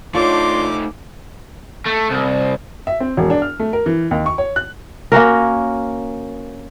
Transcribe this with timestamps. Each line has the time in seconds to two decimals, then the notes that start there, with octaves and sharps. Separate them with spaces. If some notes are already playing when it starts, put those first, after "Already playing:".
0.14 A3 D4 D#4 F4 C#5 D5 C6 D6
1.85 A3
2.10 C2
2.87 E5
3.00 C4
3.17 E1
3.30 D4
3.42 F6
3.60 A3
3.73 A#4
3.86 E3
4.11 D#2
4.26 C#6
4.38 C#5
4.56 F#6
5.12 A#3 C#4 F#4 A#4